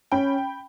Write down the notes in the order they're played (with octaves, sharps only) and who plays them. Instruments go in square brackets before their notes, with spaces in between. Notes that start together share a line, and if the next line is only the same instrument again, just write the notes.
[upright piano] C#4 [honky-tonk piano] G5 B5